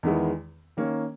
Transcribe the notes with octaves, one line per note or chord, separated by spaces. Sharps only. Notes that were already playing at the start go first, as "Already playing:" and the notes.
E2 D#3 G#3 B3 E4
D#3 A#3 C#4